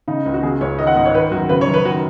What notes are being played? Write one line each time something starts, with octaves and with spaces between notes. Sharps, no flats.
C#3 D#4
C#2
F#4
C#3 G#4
C#2 C#5
D#3 D#5
F#5
G#2 D#5
C#5
D#3 B4
F#2 F#4
C#3 B4
C#5
F#2
B4
D#3 F#4